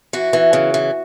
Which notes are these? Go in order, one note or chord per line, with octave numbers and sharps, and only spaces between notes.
E3 F#4
E3
C#3
E3